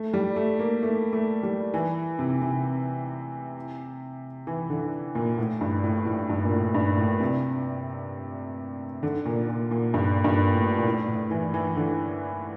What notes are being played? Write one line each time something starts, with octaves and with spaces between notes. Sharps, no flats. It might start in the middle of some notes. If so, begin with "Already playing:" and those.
Already playing: A3
G3
A3
A#3
A3
A3
G3
E3
C3
C3
E3
D3
A#2
A2
G2
A2
A2
G2
A#2
A2
G2
A2
C3
D3
A#2
A#2
A#2
G2
G2
A2
A#2
A2
A2
E3
E3
D3